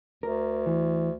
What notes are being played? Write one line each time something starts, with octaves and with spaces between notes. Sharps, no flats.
D2 A#4
E3